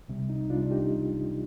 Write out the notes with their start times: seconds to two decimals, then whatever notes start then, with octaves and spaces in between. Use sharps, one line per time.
0.08 C2 C3 G3
0.30 D#4
0.50 C2 C3 G3 D4 F4
0.71 D#4 G4